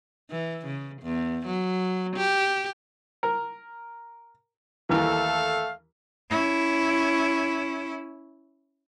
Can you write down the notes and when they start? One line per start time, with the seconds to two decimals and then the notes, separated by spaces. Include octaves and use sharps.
0.31 E3
0.66 C#3
1.02 E2
1.46 F#3
2.16 G4
3.23 A#4
4.89 D#2 E3 A3 A4 F5
6.30 C#4 E4